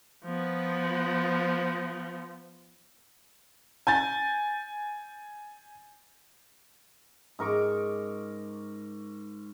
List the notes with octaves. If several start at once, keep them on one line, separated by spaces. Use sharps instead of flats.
F3 B3
G#5 G6 A6
G#2 A#4 C#6 D6